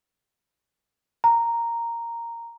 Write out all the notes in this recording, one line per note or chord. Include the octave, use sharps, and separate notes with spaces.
A#5